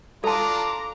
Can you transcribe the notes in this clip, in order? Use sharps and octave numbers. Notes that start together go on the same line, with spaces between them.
D4 F4 A4 A5 A#5 D6